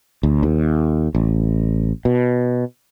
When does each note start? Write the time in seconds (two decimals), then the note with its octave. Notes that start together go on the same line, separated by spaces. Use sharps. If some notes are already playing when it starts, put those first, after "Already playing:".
0.23 D2
0.43 D#2
1.15 A1
2.05 B2